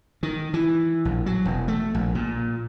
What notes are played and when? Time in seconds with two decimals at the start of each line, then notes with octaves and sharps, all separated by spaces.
0.23 D#3
0.54 E3
1.05 A#1
1.26 F#3
1.45 E1
1.68 A3
1.95 A#1
2.15 A#2